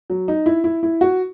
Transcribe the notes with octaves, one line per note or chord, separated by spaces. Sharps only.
F#3
D#4
E4
E4
E4
F#4